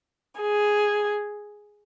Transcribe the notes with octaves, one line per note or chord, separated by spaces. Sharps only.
G#4